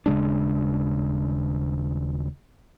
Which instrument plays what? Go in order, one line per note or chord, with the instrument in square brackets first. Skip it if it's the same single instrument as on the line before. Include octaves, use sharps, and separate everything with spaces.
[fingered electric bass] D#1 C#3 G#3 D4